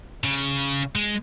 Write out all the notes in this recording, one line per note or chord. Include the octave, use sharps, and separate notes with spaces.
C#3
G#3